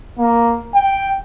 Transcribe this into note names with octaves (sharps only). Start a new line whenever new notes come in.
A#3
G5